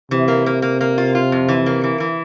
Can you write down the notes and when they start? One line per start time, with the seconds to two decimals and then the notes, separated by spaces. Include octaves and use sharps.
0.11 C3 E3
0.28 A#3
0.46 A#3
0.62 A#3
0.81 A#3
0.98 F4
1.15 F4
1.32 F2
1.49 E3
1.66 A#3
1.84 E3
2.00 E3